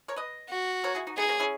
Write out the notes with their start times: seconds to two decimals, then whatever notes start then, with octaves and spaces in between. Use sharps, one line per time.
0.08 A#4 C#5
0.16 B4 D#5
0.50 F#4
0.84 A#4 C#5
0.95 E4 G#4
1.07 D#4 F#4
1.17 B3 D#4 G#4
1.29 A#3 C#4
1.40 C#4 E4